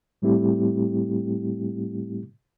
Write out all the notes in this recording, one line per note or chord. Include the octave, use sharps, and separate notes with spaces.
A2 G3 A3 C4 E4 G4